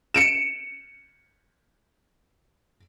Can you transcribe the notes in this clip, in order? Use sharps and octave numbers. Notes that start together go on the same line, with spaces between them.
C#7 D7 E7